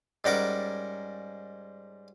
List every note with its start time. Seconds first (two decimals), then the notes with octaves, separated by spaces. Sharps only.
0.24 G#2 G3 C#4 A#4 F#5 D6